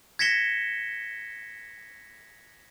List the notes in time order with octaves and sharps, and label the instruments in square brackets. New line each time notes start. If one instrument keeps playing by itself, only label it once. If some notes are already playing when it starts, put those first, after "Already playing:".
[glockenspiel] G#6 A#6 B6 C#7 E7 G7